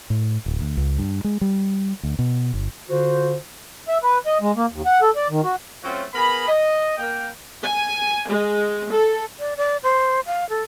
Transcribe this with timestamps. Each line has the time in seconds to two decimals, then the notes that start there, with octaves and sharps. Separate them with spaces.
0.10 A2
0.46 D1
0.61 D2
0.77 C#2
0.99 G2
1.24 G#3
1.41 G3
2.03 D2
2.19 B2
2.54 G1
2.89 D3 F4 F#4 C5
3.88 E5
4.03 B4
4.26 D#5
4.41 G#3
4.56 A#3
4.73 D#2
4.86 F#5
5.02 A4
5.16 D5
5.30 D#3
5.44 F#4
5.83 F#3 A3 C4 C#4 F4 F#4
6.14 B3 G#4 A#4 B5
6.47 D#5
6.97 A#3 G5
7.63 G#5
8.28 G#3
8.91 A4
9.39 D5
9.57 D5
9.83 C5
10.26 F5
10.49 A4